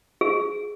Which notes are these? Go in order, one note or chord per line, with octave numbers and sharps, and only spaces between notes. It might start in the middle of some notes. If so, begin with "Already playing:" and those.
G#4